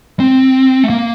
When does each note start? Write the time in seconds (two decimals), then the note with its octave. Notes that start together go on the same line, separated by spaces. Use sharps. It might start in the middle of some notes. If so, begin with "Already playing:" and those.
0.20 C4
0.84 A3
0.90 A#3